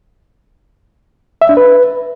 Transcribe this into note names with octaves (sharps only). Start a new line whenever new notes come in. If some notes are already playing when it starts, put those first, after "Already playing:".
E5
D4
B4